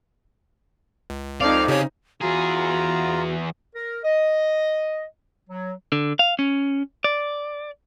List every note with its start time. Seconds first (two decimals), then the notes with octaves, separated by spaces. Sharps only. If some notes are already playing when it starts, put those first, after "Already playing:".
1.10 C#2
1.41 F2 C4 D#4 D5 F5
1.68 C#3 G4 C#5
2.21 E2 F4 F#4 G#4 A#5
3.75 A#4
4.05 D#5
5.50 F#3
5.92 D3
6.19 F5
6.39 C#4
7.04 D5